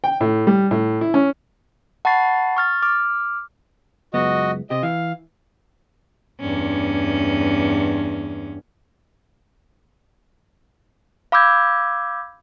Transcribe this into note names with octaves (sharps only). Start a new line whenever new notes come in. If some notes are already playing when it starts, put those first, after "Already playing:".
G5
A2
G3
A2
E4
C#4
F#5 A5 B5 C#6 A6 C7
C#6 F6 A6
D6 F6
C#2 F#2 B3 F#4 D#5
C3 G4 D#5
E3 F5
E2 G2 C#4
F5 B5 D6 E6 G6 G#6